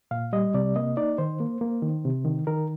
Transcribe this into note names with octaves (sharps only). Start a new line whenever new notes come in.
A#2 F5
G3 D#5
C3 D5
A#3 D#5
D#4 D5
D#3 C5
A#3
A#3
D#3
C3
D#3
D#3 A#4